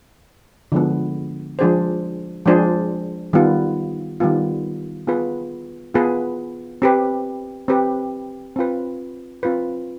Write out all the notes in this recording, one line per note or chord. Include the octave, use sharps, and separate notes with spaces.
D3 F3 G#3 B3
F3 G#3 D4 G#4 C5
F3 G#3 D4 G#4 C5
D#3 G3 B3 F4
D#3 G3 B3 F4
B3 F4 G#4 B4
B3 F4 G#4 B4
C4 G4 B4
C4 G4 B4
C4 F4 B4
C4 F4 B4